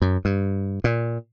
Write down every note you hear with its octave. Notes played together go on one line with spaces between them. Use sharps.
F#2
G2
A#2